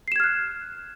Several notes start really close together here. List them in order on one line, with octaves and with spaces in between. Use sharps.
C7 E7 G#6 F6 F#6